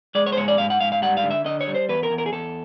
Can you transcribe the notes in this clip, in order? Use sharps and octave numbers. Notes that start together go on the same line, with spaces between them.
G#3 D5
C#5
C5
G#2 C#5
D5
G#2 F5
F#5
G#2 F5
F5
G3 F#5
F5
D3
E5
D3 D#5
C#5
G3
C5
E2 B4
A#4
E2
A#4
G#4
E2 A4